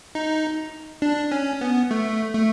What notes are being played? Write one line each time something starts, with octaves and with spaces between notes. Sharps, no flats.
D#4
D4
C#4
B3
A3
A3